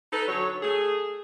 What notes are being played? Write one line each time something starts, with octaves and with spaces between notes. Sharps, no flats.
D#4 A4 B4
D3 F#3 C#5
A3 G#4